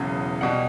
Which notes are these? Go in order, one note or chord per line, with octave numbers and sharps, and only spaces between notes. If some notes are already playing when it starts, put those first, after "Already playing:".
Already playing: E1 E2 C#3 F#3
B2 G3 F#5